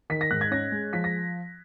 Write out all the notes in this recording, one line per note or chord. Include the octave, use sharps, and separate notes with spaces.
D#3 B6
A#6
G#2 F#6
G#6
C#4 A#6
G#3
F3 B6
A#6